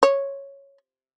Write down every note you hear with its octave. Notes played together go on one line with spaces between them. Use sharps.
C#5